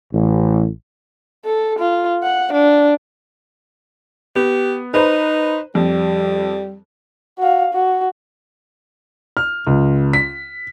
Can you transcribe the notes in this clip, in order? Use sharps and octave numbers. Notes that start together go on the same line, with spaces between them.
A1
A4
F4
F#5
D4
B3 G4
D#4 B4 C5 A#5
F2 G3
F#4 F5
F#4
F6
C#2
B6